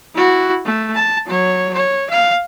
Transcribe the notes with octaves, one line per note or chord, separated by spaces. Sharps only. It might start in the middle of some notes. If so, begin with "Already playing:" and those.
E4 F#4
A3
A5
F#3 C#5
C#5
F5